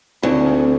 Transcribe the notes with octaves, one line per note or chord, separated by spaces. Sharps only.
D2 C4 D#4
C4